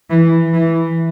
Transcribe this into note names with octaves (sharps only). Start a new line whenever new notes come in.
E3
E3